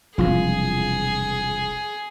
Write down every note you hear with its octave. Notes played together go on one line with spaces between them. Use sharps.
E1 C2 F3 F4 G#4